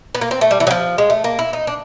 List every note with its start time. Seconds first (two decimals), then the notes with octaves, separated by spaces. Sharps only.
0.15 B3
0.21 A#3
0.31 C4
0.41 A3
0.51 G3
0.60 E3
0.67 F#3
0.71 F3
0.98 G#3
1.10 A3
1.24 A#3
1.39 E4
1.53 D#4
1.67 D4